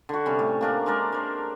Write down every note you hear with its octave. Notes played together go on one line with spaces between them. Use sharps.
D3 F#4
C3 G3 C#4
A2
A#3 D4 A#4
G#3 D4 A#4 D5
A#4 C5